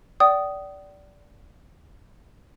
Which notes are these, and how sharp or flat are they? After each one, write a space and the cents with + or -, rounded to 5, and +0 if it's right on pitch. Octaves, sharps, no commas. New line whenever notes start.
D5 -15 G5 -45 D#6 +0